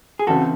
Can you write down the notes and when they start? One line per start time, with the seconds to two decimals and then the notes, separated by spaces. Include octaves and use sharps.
0.19 G#4
0.27 C#3 E3 C4 F#4 A4